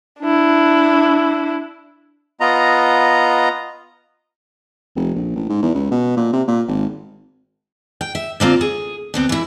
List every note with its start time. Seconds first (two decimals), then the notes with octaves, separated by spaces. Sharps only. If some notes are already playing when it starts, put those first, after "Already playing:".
0.20 D4 E4
2.40 B3 F4 D#5 A#5
4.96 F1
5.15 A#1
5.36 A1
5.49 G#2
5.62 E2
5.74 C#2
5.91 B2
6.17 A#2
6.33 C3
6.47 A#2
6.68 G#1
8.01 G5
8.15 E5
8.40 D3 A#3 C4 F4
8.61 G#4
9.14 D2 B3 C4
9.29 E3 E4